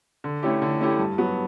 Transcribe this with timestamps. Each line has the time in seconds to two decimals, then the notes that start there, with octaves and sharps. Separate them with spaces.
0.24 D3
0.43 A3 C#4 E4 G4
0.62 D3
0.81 A3 C#4 E4 G4
0.99 G2
1.18 F#3 B3 F#4